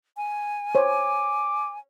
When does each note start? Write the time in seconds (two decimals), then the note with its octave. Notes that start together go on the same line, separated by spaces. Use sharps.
0.17 G#5
0.75 C5 C#5 D6